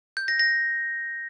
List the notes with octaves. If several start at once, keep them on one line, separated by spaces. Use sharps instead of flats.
G6
A#6
A#6